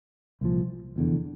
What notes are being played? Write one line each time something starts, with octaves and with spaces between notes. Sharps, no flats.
C2 A#2 F3
F1 E2 D3